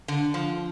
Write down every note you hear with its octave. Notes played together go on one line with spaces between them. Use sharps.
D3
F3